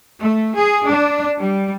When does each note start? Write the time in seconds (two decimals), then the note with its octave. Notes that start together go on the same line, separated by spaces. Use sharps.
0.22 A3
0.59 G#4
0.89 D4
1.38 G3